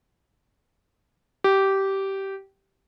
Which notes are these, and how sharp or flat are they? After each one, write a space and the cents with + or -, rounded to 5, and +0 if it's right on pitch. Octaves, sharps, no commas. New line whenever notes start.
G4 -15